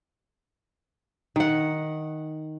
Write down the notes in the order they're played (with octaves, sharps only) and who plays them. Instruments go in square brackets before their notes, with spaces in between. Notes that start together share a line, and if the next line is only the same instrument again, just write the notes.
[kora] D#3 F#5